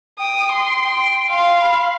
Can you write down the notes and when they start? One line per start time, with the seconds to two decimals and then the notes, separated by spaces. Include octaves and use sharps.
0.19 G5 D#6
0.52 C6
0.84 G5
1.30 F5 C6
1.61 B5